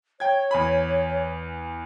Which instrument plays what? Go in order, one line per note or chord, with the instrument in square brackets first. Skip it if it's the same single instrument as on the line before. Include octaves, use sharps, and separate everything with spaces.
[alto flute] C#5 [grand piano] G5 G#6
[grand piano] E2 G#5 B5